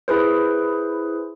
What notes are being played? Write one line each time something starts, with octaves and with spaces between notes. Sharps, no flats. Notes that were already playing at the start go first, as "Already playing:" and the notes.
E4 G#4 B4 C5